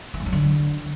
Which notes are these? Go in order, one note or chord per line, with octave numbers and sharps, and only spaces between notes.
E3
G#2
F#3
D3